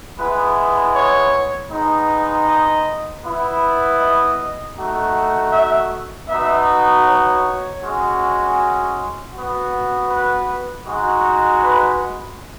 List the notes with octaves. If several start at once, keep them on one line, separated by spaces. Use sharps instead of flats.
G#3 B3 E4 B4
C#5
G#3 B3 D#4
D#5
B3 E4
D#5
A3 D#4 F#4
E5
B3 D#4 F#4 E5
C#5
G#3 C#4 F#4
B3 F#4
B4
G#3 D#4 F#4
B4